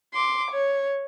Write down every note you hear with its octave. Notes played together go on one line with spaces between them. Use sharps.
C6 D6
C#5